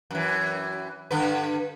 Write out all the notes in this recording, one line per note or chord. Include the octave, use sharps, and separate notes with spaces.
F#2 E3
G2 D3 B4